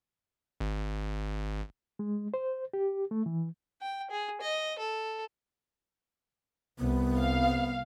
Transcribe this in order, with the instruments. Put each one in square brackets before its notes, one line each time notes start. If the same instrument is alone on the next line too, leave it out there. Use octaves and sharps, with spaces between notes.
[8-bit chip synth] G#1
[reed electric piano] G#3
C5
G4
A3
E3
[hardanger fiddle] G5
G#4
D#5
A4
[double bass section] C2 [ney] B3
[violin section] F5